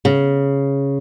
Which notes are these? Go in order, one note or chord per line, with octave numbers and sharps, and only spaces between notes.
C#3